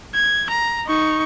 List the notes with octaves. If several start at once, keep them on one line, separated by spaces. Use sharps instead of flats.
G#6
A#5
D#4 C#6